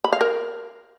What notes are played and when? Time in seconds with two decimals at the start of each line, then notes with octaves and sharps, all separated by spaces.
0.04 B5
0.13 F5
0.21 A#4